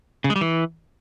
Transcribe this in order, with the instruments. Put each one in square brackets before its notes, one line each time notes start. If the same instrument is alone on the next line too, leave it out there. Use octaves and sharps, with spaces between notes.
[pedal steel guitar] C#3
G#3
G3
E3